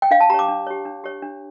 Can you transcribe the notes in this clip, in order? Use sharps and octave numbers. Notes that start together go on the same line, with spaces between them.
G5
D4 F5
A5
G4 C#5 A#5 D6
D4
G4 C#5
D4
G4 C#5
D4